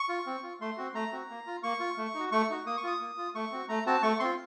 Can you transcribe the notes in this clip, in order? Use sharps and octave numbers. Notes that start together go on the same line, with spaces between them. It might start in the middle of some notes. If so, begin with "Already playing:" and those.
Already playing: C#6
F4
C4
F4
A3 C6
C4 F#4
A3 A#5
C4 F#4
A#3
F4
A#3 C#6
F4
A3
D#4 F#4
A3 C#6
D#4 F#4
A#3 D#6
C#6
F4 D#6
A#3
F4
A3 C#6
C4 F#4
A3 A#5
C4 F#4 A5
A3 C#6
C4 F4 C6